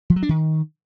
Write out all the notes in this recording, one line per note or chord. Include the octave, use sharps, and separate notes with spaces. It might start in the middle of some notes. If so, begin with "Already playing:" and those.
F3
F#3
D4
D#3